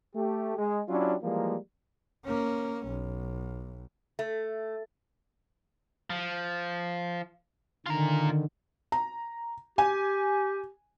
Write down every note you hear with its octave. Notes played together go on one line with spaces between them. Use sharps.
A3 G4
G#3
F#3 C#4 D4 E4 F4 G4
E3 F3 G3 G#3 A#3
A#3 C#4
B1
A3
F3
D3 D#3 F4 A#5
A#5
G4 G#5